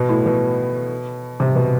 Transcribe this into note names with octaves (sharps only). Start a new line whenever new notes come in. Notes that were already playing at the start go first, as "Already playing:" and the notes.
Already playing: B2
A2
B2
C3
B2